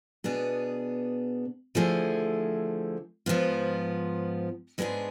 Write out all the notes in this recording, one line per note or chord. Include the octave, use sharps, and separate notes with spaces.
B2 B3 D4 G#4
D3 F3 A3 E4 G#4
G#2 F3 B3 F4
G#2 G#3 B3 D4 G#4